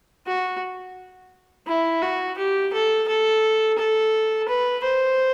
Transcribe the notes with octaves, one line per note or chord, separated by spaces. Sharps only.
F#4
E4
F#4
G4
A4
A4
A4
B4
C5